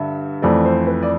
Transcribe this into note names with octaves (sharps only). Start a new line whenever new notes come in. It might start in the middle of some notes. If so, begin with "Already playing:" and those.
Already playing: G2 D3 E5
F2 E3 A3 D5
C5
B4
D5